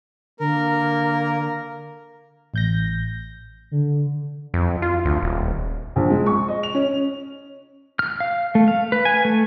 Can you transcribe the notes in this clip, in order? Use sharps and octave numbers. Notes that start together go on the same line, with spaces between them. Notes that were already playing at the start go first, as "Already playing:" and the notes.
D3 A#3 A#4
A1 G6 A#6
D3
F2
F4
D2
D#1
A#1
G#3
C#6
D#5
F7
C#4
F6
F5
A3
F5
B4
G#5
A3